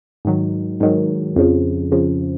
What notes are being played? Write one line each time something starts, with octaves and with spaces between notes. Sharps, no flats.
G#2 D#3 F#3
G#2 D#3 F#3
F2 C#3 F3
F2 C#3 F3